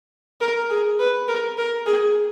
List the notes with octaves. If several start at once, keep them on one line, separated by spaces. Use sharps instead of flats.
A#4
G#4
B4
A#4
A#4
G#4